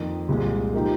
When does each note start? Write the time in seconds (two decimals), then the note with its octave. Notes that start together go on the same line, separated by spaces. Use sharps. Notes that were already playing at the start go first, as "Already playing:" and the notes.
Already playing: F2 D#3 A#3
0.28 C2 A#2 G#3
0.74 F3 A#3 D#4 G4